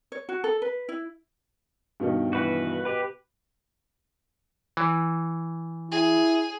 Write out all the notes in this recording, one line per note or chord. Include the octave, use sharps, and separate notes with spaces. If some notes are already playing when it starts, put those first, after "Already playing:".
C#5
F#4
A4
B4
E4
G2 B2 D#3
E3 F#4 B4
B2 G4 B4
E3
E4 G#4